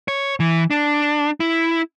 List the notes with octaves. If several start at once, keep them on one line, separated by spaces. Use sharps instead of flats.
C#5
E3
D4
E4